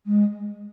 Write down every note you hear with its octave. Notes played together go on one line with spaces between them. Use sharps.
G#3